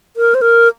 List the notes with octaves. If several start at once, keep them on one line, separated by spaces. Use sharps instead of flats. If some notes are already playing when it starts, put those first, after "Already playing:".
A#4
C5
A#4